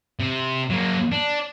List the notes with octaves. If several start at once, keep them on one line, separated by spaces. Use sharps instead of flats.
C3
F#3 A#3
D4